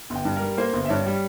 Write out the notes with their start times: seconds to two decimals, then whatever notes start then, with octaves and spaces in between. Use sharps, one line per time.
0.10 G1
0.15 G5
0.25 G2
0.37 G3 A#4
0.57 A#3 C5
0.73 G1
0.85 E5
0.89 G2 C#5
1.06 G3